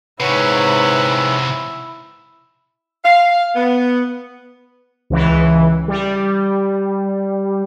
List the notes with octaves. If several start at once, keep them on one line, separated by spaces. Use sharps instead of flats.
G#2 C3 C#4 E4 B4 C#5 F#5
F5
B3
C#2 E3
G3